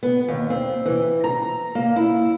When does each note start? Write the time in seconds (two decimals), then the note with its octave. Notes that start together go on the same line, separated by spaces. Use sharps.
0.03 B3
0.28 D#2
0.50 C4
0.86 E3
1.24 A#5
1.75 A#3
1.96 E4